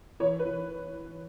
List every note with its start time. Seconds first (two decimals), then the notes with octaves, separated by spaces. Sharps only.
0.20 E3 C#5
0.39 B4
0.45 E3